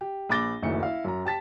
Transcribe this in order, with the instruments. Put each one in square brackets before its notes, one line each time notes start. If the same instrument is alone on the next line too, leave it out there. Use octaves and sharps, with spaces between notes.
[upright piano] G4
A#1 B5 D6 A6 A#6 G7
F#1 D2 D#3 F#3 E4 C#7
E4 F5
F#2 A#5
G4 A5 A6 B6